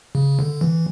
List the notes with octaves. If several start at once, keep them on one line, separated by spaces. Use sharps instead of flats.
C#3
D3
E3